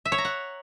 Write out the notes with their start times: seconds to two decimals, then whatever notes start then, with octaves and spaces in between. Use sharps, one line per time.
0.05 E5
0.12 C#5
0.18 A#5
0.25 F#5